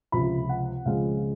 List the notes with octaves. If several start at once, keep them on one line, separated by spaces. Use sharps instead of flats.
C#2 C3 F3 B5
F#5
C#2 C#3 F3 G#3 C4 F5